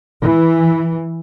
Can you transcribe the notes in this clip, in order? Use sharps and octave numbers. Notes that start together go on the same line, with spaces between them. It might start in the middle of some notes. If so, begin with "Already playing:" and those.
E3